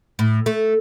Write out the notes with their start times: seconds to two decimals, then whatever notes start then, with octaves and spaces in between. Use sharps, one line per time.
0.19 A2
0.46 A3